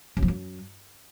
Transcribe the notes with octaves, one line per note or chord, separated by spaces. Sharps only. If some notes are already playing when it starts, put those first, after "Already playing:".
F#2
F3
F#2